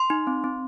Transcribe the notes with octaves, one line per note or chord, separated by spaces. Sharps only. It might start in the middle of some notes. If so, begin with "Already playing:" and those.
Already playing: C6
D#4
C4
C4